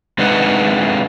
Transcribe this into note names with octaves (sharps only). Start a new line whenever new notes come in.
C3 G#3 D4 D#4 B4 F#5